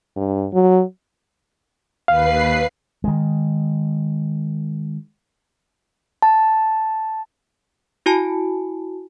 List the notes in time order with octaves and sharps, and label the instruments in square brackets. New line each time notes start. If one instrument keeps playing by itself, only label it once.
[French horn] G2
F#3
[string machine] D#2 B4 C7 [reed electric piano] F5
[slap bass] D#3 G#3
[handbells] A5
E4 F#4 G#5 A5